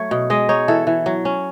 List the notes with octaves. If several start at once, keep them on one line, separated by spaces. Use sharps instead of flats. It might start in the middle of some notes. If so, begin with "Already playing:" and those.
Already playing: F#3 A3 C#5
B2
G#3 D#5
D#4 C#5
E3 A4
E3
F#3
C#4